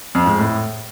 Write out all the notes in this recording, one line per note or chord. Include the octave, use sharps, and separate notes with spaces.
F2
G#2
A2